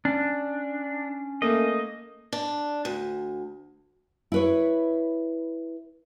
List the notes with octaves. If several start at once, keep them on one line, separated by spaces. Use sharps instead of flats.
C#4 D4
A3 A#3 D#5
D4
D2
E4 B4 C#5